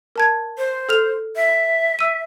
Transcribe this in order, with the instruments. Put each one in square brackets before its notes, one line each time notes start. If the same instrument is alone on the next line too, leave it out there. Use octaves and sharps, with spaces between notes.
[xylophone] A#4 A5 G#6
[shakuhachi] C5
[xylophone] A4 F6 F7
[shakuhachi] E5
[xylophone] E6 D#7